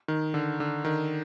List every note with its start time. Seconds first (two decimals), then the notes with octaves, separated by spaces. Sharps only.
0.08 D#3
0.34 D3
0.60 D3
0.85 D#3